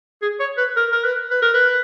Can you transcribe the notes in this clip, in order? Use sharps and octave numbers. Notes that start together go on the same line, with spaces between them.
G#4
C#5
B4
A#4
A#4
B4
B4
A#4
B4